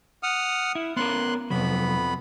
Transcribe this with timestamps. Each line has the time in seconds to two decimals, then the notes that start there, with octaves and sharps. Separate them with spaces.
0.23 F#5 D#6 F6
0.75 E4
0.97 B3 C#4 A#4 C6 F#6
1.50 F2 C3 F#3 B3 B5